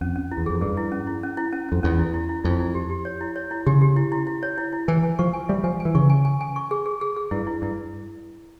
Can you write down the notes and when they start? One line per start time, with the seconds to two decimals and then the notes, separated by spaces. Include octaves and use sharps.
0.01 F2 C#4
0.16 C#4
0.32 E4
0.37 E2
0.46 F2 G#4
0.61 G2 G#4
0.77 E4
0.92 C#4
1.07 E4
1.23 C#4
1.37 E4
1.53 C#4
1.69 F2 C#4
1.83 E2 C#4
1.99 E4
2.14 E4
2.29 E4
2.44 F2 E4
2.60 E4
2.75 G4
2.90 G4
3.05 C#5
3.21 E4
3.36 C#5
3.51 E4
3.66 C#3 G4
3.82 G4
3.96 E4
4.12 E4
4.27 E4
4.43 C#5
4.58 E4
4.73 E4
4.88 E3 G#5
5.03 G#5
5.19 F3 C#6
5.33 G#5
5.49 G3 E5
5.64 F3 G#5
5.80 G#5
5.85 E3
5.95 C#3 C#6
6.10 G#5
6.25 G#5
6.41 G#5
6.56 C#6
6.71 G#4
6.86 G#4
7.01 G#4
7.16 G#4
7.31 G2 E4
7.47 E4
7.62 G2 E4